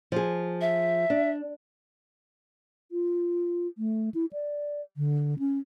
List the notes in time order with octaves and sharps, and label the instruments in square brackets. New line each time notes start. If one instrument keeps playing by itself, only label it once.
[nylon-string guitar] F3 G#4
[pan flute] E5
[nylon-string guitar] D4
[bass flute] F4
A3
E4
D5
D3
C#4